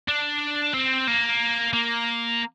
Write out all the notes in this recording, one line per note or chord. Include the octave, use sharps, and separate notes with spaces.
D4
C4
A#3
A#3